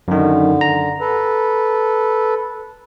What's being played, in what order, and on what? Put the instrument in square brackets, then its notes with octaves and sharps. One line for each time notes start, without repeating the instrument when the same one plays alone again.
[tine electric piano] F#2 D#3 [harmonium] D3
[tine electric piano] A#5
[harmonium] A4 B4